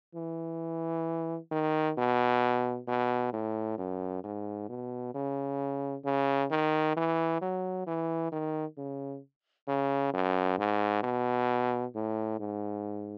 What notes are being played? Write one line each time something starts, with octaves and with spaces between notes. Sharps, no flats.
E3
D#3
B2
B2
A2
F#2
G#2
B2
C#3
C#3
D#3
E3
F#3
E3
D#3
C#3
C#3
F#2
G#2
B2
A2
G#2